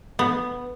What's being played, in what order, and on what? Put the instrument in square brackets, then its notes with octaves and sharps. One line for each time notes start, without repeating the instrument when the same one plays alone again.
[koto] B3